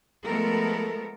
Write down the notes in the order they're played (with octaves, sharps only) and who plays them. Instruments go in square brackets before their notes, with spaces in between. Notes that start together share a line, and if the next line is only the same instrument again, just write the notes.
[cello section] F3 G#3 A3 B3 A4 A#4